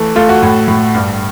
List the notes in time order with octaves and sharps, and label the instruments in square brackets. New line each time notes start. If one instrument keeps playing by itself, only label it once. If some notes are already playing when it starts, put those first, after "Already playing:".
Already playing: [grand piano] E3 A3
A3 F4
F#4
A2
A2
G2